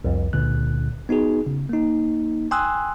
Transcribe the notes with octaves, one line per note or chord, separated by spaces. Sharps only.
C2 F2
C#2 A#2 D3 F#6
B3 D#4 F#4 G#4
C#3
A#3 D#4
G5 G#5 C6 D#6 E6 F#6